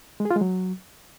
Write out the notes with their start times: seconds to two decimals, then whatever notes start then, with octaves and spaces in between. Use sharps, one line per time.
0.20 G#3
0.25 G#4
0.31 F4
0.36 G#3
0.41 F#3